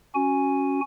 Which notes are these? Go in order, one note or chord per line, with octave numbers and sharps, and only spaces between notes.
C#4 F#4 G#5